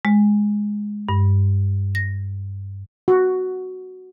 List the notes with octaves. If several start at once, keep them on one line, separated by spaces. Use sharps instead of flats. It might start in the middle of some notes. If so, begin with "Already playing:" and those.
G#3
G2
A#6
F#4